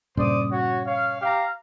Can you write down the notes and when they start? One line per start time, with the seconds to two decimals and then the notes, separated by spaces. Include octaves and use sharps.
0.17 G2 A#2 C#3 C5 D5 D#6
0.52 F#4 C#5
0.86 C#5 F5
1.22 G4 F5 A#5